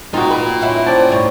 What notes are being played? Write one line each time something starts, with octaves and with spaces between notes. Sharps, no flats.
C4 D#4 F4 F#4 A#5
B4
C#4 E4 F#5
C5 D5 G5 A5
D2 G#2 C#5